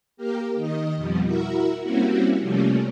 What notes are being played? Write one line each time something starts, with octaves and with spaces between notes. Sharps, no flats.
A#3 G4 A#4
D#3 D#5
F2 B2 F3 G3
E4 F#4 A#4 E5
G3 A#3 C4 C#4 E4 F#4
C3 F3 G3 A3 A#3 C#4